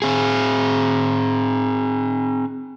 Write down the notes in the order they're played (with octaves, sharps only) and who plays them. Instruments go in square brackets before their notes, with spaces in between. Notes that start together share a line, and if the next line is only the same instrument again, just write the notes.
[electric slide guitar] C4 G#4